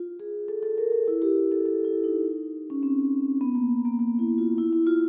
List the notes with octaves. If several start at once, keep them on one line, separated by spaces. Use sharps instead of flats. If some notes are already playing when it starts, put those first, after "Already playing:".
Already playing: F4
G#4
A4
A4
A#4
A4
E4
G4
A4
A4
E4
D#4
C#4
C4
B3
A#3
A#3
A#3
E4
F4
E4
E4
F4